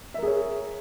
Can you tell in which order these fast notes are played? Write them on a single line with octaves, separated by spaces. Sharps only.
E5 A#4 G#4 C#5